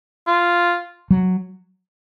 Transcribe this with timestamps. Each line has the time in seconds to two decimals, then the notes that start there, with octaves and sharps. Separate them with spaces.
0.27 F4
1.11 F#3